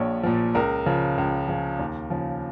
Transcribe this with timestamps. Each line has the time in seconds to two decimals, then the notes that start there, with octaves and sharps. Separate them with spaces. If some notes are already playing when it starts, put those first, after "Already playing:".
Already playing: A#1 A#2 F3 C#5
0.23 A#2 F3
0.55 C#2 A#4
0.86 C#3 F3
1.18 C#2
1.48 C#3 F3
1.79 D#2
2.10 C#3 F3